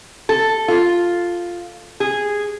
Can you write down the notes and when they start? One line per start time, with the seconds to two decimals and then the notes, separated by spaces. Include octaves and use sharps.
0.29 A4
0.68 F4
2.00 G#4